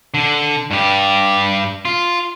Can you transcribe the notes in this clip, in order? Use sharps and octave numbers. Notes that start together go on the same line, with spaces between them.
D3
G2 G4
F4